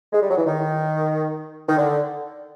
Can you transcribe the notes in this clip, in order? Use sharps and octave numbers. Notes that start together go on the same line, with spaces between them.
G#3
G3
F#3
E3
D#3
D#3
D3